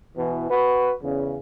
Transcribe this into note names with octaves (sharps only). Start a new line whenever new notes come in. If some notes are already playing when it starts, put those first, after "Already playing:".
B2 E3
F#4 B4
E2 C#3